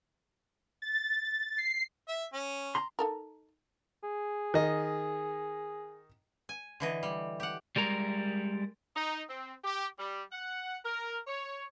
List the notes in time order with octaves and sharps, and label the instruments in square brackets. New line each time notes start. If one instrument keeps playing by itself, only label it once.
[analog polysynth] A6
C7
[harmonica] E5
C#4
[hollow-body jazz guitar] A#5 C6
[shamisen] D#4 A4 A#4
[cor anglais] G#4
[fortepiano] D#3 D#5
[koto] G#5
D3 E3 D#5
G3
G4 F#5
[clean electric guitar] G3 G#3 A#4 A#5
[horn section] D#4
C4
G4
G3
F#5
A#4
C#5